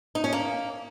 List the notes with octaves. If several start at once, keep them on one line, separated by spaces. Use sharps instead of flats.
D#4
C#4
A#3